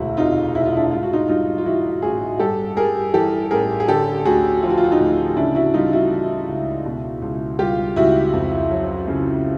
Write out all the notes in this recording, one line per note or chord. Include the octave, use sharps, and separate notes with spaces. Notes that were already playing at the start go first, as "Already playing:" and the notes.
Already playing: E1 D2 E4 F#4
C3 D#4 F4
E1 E4
F4
D4 E4
G#2 F4
F#4
D#4 F4
G3 D#4 F4
F4
E3 E4 F#4
A1 F#4 G#4
G2 G4 A4
G3 G#4 A#4
E3 G4 A4
A1 G#4 A#4
G#4
D3 G4 A4
D2 F#4 G#4
F3 F4
F#4
F4
F#4
D#4 F4
D2
C#3 D4 E4
E4 F#4
G3 D#4 F4
E4 F#4
E3
C#2
B2
C#2
G3 F4 G4
C#2 E4 F#4
F2
F#3
C#3